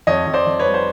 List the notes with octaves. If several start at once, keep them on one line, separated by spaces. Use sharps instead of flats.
F2 C#5 D#5
F2
C5 D5
F2
B4 C#5
G3
C5